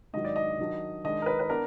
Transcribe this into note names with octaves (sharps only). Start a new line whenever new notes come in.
G#2 D#3 F#3 D#5
D5
D#5
D#3 F#3 D4
D#3 G#3 D4 D#5
A#4
B4
B4
B3 D4 A#4